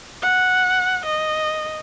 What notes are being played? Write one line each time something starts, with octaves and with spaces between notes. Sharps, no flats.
F#5
D#5